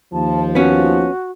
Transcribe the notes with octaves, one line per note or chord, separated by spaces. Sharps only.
D#2 F3 A5
B3 C#4 F#4